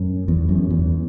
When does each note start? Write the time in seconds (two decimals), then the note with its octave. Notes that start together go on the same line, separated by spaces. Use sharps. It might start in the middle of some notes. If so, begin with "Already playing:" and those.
Already playing: F#2
0.28 E2
0.49 F#2
0.70 E2